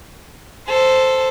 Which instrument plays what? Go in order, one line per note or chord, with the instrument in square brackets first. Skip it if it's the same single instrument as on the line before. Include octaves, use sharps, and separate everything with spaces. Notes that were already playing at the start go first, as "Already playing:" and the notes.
[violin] A4 C5